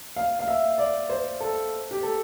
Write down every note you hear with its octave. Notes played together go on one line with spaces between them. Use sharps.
F5
F5
E5
D5
C5
A4
G4
A4